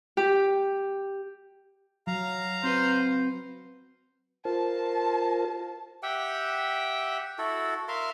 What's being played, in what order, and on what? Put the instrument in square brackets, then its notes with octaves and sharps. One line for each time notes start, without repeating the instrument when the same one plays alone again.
[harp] G4
[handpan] F#3 [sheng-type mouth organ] F5 A#5
[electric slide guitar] C4 F#4 B4 [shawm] C5
[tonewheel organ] F4 A#4 C5 [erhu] A5
[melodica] G4 E5 F#5 G5
E4 F#4 A4
A#4 E5 F5 C6